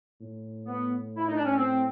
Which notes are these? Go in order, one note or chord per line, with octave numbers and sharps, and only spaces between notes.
A2
B3
E4
D#4
D4
C#4
C4